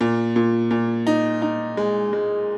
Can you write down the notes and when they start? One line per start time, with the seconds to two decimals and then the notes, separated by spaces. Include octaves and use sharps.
0.01 A#2
0.36 A#2
0.71 A#2
1.07 D#4
1.42 D#4
1.77 G#3
2.13 G#3